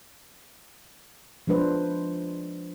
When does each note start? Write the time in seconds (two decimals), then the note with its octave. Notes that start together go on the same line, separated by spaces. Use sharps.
1.47 F3 G#3 D4 B4 C5